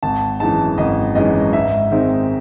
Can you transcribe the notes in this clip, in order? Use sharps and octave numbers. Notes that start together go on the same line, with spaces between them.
G#1 A5
F#2 E3 G#3 D#4 A5
G#1 D#5
F#2 E3 G#3 D#4 D#5
G#2 E5
D#3 G#3 C4 D#4